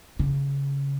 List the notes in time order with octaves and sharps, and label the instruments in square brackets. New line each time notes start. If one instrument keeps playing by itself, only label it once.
[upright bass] C#3